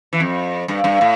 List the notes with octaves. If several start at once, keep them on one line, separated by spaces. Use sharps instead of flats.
E3
F2
G2
G2
A2